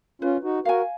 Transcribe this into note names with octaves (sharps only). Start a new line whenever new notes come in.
C#4 F4 B4
D#4 F#4
F#4 A#4 F5 G#5